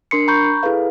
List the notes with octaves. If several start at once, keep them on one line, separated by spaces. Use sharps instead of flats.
D4 A#4 C6 C7 C#7
A#5 B5 C#6 G6
E4 G#4 A4 B4 F5